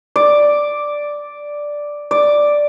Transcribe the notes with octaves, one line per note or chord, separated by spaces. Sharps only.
D5
D5